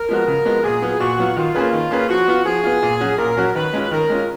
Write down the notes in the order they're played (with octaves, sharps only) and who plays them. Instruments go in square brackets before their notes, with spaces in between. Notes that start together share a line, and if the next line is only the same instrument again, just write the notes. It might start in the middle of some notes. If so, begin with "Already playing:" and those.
Already playing: [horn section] A#4
[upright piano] F3 G#3 B3 F#4
C#3
F3 G#3 B3 F#4
[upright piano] A#2 [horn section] G#4
[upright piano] F#3 B3 F4
[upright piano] A#2 [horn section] F#4
[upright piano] F#3 B3 F4
[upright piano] D#3 [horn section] F4
[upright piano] A#3 C#4 G#4 B4
D#3
A#3 C#4 G#4 B4
[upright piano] F3 [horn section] F#4
[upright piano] B3 F4
[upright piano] F3 [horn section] G#4
[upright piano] B3 F4
A#2
F#3 C#4 F#4
[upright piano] A#2 [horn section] A#4
[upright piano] F#3 C#4 F#4
[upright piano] D#3 [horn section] B4
[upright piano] G#3 C#4 F4
[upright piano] D#3 [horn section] A#4
[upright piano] G#3 C#4 F4